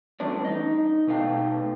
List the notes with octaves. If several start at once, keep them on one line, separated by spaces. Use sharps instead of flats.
E3 G3 A3 C#4 D4 D5
D#4 D#5
B2 A3 D#4 F5 G5